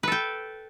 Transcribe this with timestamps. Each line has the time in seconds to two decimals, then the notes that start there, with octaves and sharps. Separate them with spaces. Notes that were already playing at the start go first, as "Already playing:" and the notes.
0.03 B4
0.08 A4
0.12 G5